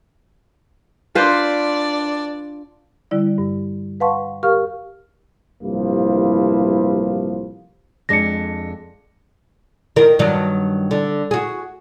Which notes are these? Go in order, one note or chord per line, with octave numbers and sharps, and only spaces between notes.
D4 F4 B4 C5 D5
D3 G3 E4 D5
G2
B4 F5 F#5 A5 C6 C#6
G4 A#4 F5 C#6 F6
A1 G2 C3 F3 A#3 E4
F2 G#3 D4 A#6 C#7
D#3 A#4
G2 D#3 F#3
D3
F#4 G#4